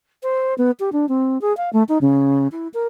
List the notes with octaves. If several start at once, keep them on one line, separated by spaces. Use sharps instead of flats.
C5
B3
G4
D4
C4
G#4
F5
A3
D#4
C#3
E4
A#4